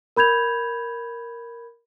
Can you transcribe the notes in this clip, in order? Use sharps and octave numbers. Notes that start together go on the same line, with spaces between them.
A#4 B5 G6 G#6 F7